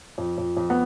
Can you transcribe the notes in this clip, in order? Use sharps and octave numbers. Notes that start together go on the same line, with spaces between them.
F2
F2
F2
B3